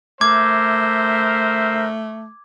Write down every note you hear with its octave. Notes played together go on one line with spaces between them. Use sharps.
A3 A#4 C5 E5 D6 G#6